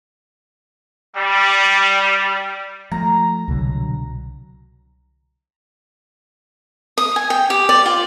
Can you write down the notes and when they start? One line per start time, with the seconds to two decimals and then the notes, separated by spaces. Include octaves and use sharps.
1.16 G3
2.91 F3 A3 A#5
3.48 C2 B2 D3 F#3
6.98 D#6
7.16 G#5
7.30 G5
7.50 G4
7.69 D5
7.86 F4